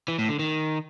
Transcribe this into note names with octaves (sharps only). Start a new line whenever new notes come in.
E3
A2
D3
D#3